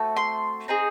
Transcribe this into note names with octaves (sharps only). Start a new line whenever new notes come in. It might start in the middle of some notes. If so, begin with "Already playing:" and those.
Already playing: A3 C4 F#4 A4
C6
C4 D#4 G#4